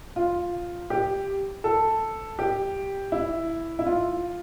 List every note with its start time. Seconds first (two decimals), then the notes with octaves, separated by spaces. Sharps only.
0.16 F4
0.90 G4
1.64 A4
2.39 G4
3.12 E4
3.79 E4
3.87 F4